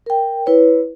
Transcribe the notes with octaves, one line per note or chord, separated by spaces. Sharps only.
A#4 G5
E4 B4 C#5